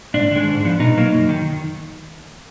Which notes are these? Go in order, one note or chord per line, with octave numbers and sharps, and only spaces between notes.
G#2 D4
D#3 G#3
G#2
F3 B3
B2 D#4
F#3 A#3
F#2
D#3